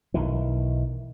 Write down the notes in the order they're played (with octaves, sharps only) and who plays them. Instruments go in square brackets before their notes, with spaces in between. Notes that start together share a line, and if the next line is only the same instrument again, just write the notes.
[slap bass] B1 D#3 E3